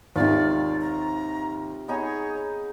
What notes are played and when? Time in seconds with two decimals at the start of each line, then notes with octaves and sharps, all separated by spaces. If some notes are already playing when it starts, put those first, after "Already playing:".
0.16 D#2 G#2 C3 D#3 F4 D5
0.81 A#5
1.88 B3 D#4 G#4 C#5